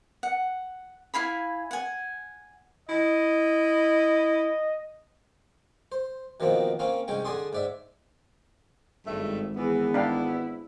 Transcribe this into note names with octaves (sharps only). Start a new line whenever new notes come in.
F#5
E4 F5 G#5 B5
F#5 G#5
E4 D#5
C5
B2 D#3 F3 A#3 C4
A#3 C4 C#4 F5
C2 G#3 C#4 G5
D3 G#4 D5 C6 D#6
G#2 D5 E5
G#1 G2 A3 E5
E3 B3 G#4
D4 E4 F5 G5